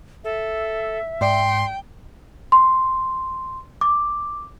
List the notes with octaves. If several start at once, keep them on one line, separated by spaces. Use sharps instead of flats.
A4 E5
G#2 D5 G5 C6
C6
D6